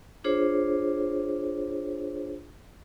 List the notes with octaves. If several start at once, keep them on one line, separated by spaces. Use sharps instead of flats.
D4 F4 G#4 C5 C#5